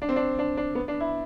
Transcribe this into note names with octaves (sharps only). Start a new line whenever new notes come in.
D4
C4
D4
D4
D4
B3
D4
E4